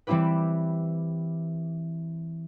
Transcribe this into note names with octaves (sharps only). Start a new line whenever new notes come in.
E3 G3 C4 E4 G4 B4